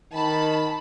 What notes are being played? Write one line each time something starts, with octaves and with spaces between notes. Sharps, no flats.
D#3 A5 B5